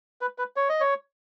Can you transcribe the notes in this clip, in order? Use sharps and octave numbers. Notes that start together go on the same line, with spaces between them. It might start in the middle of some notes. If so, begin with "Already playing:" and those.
B4
B4
C#5
D#5
C#5